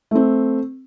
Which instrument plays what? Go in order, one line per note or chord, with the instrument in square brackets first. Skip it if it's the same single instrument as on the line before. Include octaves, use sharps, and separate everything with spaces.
[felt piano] A3 C4